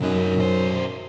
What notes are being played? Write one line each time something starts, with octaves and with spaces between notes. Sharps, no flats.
C2 F#2 D#4
B1 C5